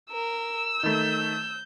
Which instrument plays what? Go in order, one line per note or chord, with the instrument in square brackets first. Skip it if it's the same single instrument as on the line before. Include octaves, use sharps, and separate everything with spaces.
[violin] A#4 [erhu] E6
[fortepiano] D#3 A3 [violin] G6